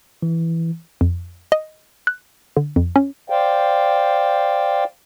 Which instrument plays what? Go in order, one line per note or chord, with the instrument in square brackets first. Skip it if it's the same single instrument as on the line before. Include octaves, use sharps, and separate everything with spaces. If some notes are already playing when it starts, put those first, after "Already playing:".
[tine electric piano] E3
[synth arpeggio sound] F2
D#5
F#6
D3
F2
C#4
[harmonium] C5 D5 F5 G5